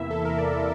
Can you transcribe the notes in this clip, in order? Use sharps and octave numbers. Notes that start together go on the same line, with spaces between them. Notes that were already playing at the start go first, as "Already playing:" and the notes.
Already playing: E2 C3 E3 A#3 E4 E5
A4
A#4
D5